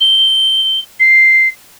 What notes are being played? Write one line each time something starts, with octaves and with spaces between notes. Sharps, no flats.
G7
C7